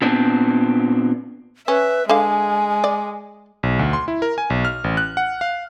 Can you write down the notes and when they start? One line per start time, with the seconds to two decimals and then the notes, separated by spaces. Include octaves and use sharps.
0.02 A#2 B3 C4 D4
1.68 C#4 B4 E5
2.09 D3 G#3 F5 G#5
2.84 D5
3.63 B1
3.79 D2
3.93 C6
4.08 E4
4.22 A#4
4.38 G#5
4.50 B1
4.65 F6
4.84 A1
4.97 F#6
5.17 F#5
5.41 F5